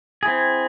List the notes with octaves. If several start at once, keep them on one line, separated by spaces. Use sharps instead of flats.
C4 E4 G#4